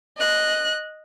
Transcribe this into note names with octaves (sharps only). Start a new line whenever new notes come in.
D#5 F#6